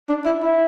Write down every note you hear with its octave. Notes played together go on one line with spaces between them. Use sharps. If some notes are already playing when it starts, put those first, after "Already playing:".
D4
E4
E4